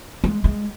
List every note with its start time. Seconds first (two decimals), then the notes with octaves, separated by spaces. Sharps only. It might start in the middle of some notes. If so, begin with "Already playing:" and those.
0.24 G#3
0.44 G#3